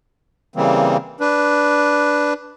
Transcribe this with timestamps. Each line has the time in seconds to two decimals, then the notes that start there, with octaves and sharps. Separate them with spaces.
0.56 C#3 E3 G3 A#3 C4
1.20 D4 B4